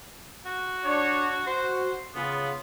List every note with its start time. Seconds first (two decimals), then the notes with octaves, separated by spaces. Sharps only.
0.46 F#4
0.84 D4 C#5
1.47 F#4 C5
2.15 C#3 B3 F4